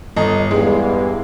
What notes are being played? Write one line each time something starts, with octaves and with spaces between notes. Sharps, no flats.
G1 D#5
E2 G2 G#3